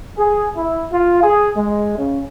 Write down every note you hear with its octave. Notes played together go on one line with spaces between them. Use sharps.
G#4
E4
F4
G#4
G#3
C#3